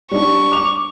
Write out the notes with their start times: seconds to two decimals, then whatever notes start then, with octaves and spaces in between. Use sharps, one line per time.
0.11 G3 D4 C#6
0.52 D6 F7